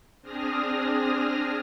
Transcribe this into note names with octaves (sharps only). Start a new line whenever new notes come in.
C4 D4 G#4 D#6 F6 A#6